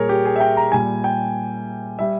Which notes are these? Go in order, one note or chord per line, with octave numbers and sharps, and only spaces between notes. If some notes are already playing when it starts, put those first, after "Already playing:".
Already playing: A#2 G3 G#4 A#4 C#5
G4
G#4
E5
G5
A#5
A#2 G3 G#5
G5
G3 E5